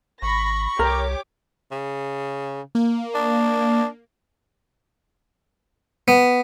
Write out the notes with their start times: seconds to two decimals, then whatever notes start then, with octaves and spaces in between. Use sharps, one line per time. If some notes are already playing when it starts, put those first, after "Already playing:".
0.22 G#1 B5 C#6 A#6
0.79 C2 G4 A#4 C#5 D6
1.72 C#3
2.75 A#3
3.15 D4
6.08 B3